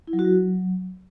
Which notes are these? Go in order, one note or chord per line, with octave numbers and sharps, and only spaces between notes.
E4
F#3
F#4
F#3